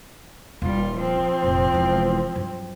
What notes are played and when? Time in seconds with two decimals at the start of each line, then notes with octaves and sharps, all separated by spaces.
0.62 D#1 G3 F4
0.96 F3 C4
1.43 F1 A#2
1.74 E1 E3
2.36 G2 F#3